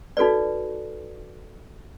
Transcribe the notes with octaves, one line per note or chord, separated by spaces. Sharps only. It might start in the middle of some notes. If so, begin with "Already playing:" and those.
D#4 F#4 A4 B4 D5